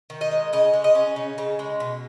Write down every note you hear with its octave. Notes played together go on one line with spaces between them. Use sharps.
D#3
D#5
G#3
C#3 D#5
G#3
D#5
C#4
C#3
C#3
G#3
B2